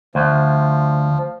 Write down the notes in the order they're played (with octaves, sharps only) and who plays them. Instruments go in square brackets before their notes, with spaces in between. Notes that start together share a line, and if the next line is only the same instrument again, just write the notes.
[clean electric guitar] D2 [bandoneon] F3